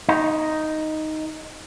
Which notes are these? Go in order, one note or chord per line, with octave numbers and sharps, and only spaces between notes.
D#4